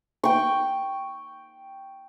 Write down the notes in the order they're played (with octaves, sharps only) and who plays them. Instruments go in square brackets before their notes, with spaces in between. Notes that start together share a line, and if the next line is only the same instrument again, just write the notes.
[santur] G5 C#6